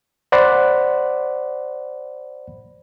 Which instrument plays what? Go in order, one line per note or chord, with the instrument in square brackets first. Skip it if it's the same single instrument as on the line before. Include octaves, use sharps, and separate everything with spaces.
[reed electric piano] C5 D5 F#5 B5